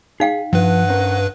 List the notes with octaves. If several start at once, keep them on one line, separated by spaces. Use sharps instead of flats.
D#4 G#4 F5 G5
G2 F3 B4 F#5
C#4 A#4 C5